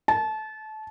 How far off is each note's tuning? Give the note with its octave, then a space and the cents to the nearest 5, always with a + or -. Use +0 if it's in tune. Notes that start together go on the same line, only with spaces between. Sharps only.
A5 -25